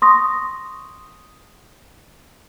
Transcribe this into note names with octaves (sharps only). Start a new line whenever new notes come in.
C6 C#6 D#6 A#6